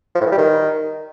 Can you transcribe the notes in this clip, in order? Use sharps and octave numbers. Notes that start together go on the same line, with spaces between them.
F3
A2
E3
G3
D#3